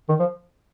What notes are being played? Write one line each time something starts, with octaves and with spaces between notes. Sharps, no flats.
D#3
F3